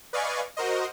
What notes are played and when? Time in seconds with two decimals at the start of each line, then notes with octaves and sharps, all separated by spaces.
0.13 B4 D5 D#5 F5 G#5 C#6
0.57 F#4 A#4 C5 D#5